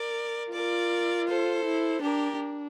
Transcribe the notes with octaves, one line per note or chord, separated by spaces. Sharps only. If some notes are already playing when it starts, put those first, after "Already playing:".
Already playing: A#4 D5
F4 A#4 D5
A4 C5
E4
D4 G4 A#4
D4